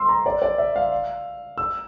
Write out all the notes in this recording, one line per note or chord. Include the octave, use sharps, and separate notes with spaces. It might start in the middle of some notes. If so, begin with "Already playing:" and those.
Already playing: C6 E6
A#5
D5
D5
E5
F5
E6